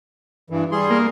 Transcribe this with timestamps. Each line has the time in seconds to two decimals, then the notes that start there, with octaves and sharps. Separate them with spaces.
0.50 G2 E3
0.72 G3 G#4 C6
0.90 A#3